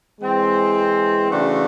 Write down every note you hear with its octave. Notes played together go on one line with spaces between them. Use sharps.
E3 G#3 C4
C#3 E3 A3 D4 F#4